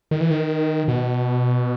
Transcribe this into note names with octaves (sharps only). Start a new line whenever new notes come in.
D#3
E3
D#3
B2